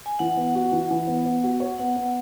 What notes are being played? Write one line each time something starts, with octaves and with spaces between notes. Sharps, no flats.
G#5
E3 F#5
B3
F#4
E3
E3
B3
B3
F#4
C#5
B3 F#5
B3